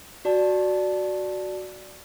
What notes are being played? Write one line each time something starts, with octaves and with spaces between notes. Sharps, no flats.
F#4 D5 A5